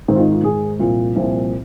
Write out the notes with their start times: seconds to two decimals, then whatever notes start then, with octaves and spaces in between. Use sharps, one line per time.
0.08 G#2 D#3 C4
0.16 F4
0.20 D#4
0.32 F4
0.44 G#2 D#3 G#4
0.79 C2 A#2 F3 F4
1.16 C2 A#2 F3